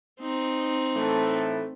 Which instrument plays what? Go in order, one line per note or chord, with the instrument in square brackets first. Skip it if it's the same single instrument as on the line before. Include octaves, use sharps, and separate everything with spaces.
[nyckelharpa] C4 D#4
[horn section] A2 E3 A3